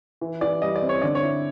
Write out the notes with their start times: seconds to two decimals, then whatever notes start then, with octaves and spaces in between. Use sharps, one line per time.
0.21 E3
0.41 E3 D5
0.62 G3 D#5
0.76 D5
0.82 C4
0.89 C#5
1.02 D3 D5
1.15 C#5
1.23 E4